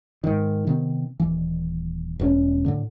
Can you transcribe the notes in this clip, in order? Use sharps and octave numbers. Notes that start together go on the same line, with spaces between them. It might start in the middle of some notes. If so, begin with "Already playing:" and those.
G#2 D#3
C3 D#3 B3 C4
D#1 E3
E1 A#2 C#4
A2 D3